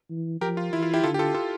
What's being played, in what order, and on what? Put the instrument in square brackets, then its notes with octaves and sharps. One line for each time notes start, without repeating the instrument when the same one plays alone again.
[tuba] E3
[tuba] F3 [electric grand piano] G4 A#4
[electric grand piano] F4
[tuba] E3 [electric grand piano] E4
[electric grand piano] F4
E4 G4
[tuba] D3 [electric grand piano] F4 A4
[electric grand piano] G4
F4 A4
F4 A4